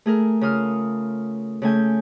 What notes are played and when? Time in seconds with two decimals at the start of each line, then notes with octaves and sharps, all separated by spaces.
0.06 A3 G#4 A#4
0.41 C#3 F4 D#6 F6
1.62 C#3 A3 G#5 G6